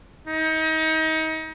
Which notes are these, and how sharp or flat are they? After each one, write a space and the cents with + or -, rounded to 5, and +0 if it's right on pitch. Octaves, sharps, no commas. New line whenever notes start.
D#4 +30